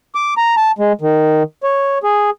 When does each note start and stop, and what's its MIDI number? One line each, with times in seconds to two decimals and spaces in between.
0.15 0.34 86
0.37 0.55 82
0.57 0.71 81
0.79 0.93 56
1.01 1.43 51
1.63 1.98 73
2.03 2.30 68